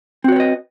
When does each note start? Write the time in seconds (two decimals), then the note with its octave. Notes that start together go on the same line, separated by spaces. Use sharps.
0.24 C4
0.28 F#4
0.32 C#5
0.36 B4
0.40 D#5